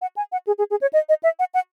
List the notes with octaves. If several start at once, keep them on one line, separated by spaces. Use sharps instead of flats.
F#5
G#5
F#5
G#4
G#4
G#4
C#5
D#5
D#5
E5
F#5
F#5